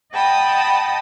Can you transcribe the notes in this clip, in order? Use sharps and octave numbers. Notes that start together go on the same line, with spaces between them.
D#5 F#5 G5 A5 B5 D#6